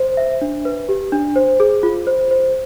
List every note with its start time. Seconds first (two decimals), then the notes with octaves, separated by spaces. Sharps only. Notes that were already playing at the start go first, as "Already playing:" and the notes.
Already playing: C5
0.17 E5
0.41 D4
0.65 B4
0.89 G4
1.12 D4
1.36 C5
1.60 G#4
1.83 F4
2.07 C5
2.31 C5